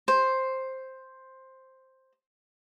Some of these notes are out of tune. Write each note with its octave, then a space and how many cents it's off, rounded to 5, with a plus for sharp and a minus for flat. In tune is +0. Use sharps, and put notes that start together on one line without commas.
C5 +5